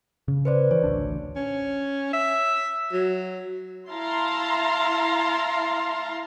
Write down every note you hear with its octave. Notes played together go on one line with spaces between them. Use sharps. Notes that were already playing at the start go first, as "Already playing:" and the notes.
C#3
B4 C5 D5
E3 C#5
A1 D2 D4
C#4
E5
F#3
E4 F5 A5 A#5 C6